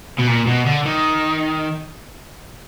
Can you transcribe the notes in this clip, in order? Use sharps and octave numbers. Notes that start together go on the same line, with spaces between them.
B2
A#2
B2
D3
D#3